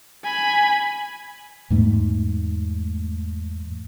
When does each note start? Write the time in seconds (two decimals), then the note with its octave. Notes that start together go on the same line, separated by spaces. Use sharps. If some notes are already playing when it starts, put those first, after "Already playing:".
0.25 G#5 B5
1.70 E2 G#2 A3